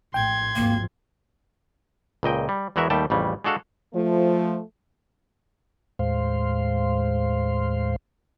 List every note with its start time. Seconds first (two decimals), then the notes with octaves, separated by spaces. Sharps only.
0.14 A#1 A2 G5 C6 G#6
0.55 G#1 D#2 F3 A#3
2.23 C#2 A#2 D#5 G5
2.49 G3
2.76 E2 E3 G#3 F#4 A#4 E5
2.90 D#2 G3 A3 G5 A5
3.10 A1 F2 C#3 G3
3.44 G#3 D4 F#4 A4 F5
3.94 F3 A3
5.99 D#2 A2 G#3 C5 F5 C6